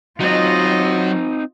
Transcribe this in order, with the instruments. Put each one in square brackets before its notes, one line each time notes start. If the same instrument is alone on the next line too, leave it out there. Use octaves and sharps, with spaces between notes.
[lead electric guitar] F#3 [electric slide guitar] C4 D#4 [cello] F4 D#5